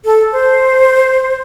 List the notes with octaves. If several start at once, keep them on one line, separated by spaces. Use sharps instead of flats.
A4
C5